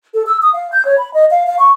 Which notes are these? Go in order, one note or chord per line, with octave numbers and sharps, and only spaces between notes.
A4
E6
D#6
F5
G6
C#5
B5
D#5
F5
F5
C#6